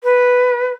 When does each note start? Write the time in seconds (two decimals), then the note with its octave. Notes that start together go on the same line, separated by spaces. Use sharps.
0.03 B4